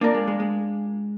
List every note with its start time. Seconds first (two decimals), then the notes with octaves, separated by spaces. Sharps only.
0.01 A#3 D4 F4 A#4 D5
0.14 G#3
0.28 G#3
0.40 G#3